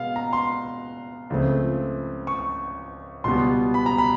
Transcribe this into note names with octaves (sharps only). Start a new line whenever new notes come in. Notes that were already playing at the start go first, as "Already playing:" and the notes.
Already playing: B2 G#3 B3 F5
A#5
C6
C#2 C#3 F3 A3 C4
C#6
C#2 B2 G3 B3 C6
B5
A#5
B5